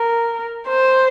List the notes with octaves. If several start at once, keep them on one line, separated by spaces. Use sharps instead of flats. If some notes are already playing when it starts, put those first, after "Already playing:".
Already playing: A#4
C5